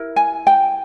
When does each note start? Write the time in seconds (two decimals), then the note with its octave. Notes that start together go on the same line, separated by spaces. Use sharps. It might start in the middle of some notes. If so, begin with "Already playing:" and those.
Already playing: E4 A#4
0.16 G#5
0.47 G5